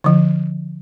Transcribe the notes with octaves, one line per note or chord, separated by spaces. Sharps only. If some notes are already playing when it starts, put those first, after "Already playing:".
D3 F3